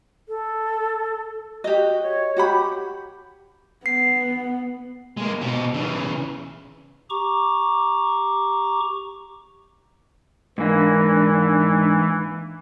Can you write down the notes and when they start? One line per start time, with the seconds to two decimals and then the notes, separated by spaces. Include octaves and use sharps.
0.28 A4
1.64 F#4 G4 D#5
2.03 C#5
2.36 F#4 G4 F#5 B5
3.86 B3 C7
5.17 G#3 A#3
5.41 B2 G4
5.74 C#3 E3
7.10 G4 A#5 C#6 D6
10.58 G#2 E3 A#3 D4